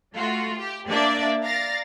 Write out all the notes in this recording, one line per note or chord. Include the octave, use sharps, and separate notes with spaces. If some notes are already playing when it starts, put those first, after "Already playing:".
A3 F4 F#4
G4
A#3 D4 D5 E5
D5 F5 A#5 A6 A#6